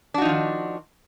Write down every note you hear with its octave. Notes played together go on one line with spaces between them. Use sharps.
D#3 F3 D4 D#4 F#4